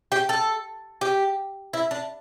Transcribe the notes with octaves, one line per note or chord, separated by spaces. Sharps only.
G4
A4
G4
E4
D4